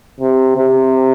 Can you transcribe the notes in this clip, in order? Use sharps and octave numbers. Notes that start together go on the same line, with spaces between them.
C3
C3